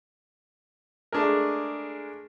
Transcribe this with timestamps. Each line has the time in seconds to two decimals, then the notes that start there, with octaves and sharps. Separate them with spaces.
1.12 G#3 A3 D4 G#4 A#4